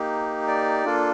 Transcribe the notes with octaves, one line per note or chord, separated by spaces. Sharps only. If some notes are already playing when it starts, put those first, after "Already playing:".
Already playing: A#3 D#4 G4
D5
A#3 D4 F4 A4